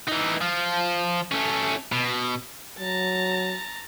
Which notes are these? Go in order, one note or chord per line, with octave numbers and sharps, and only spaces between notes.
E3 D#4
F3
A3 C#4
B2
F#3 A5 A#5